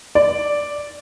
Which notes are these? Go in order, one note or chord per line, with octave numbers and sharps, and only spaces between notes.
D5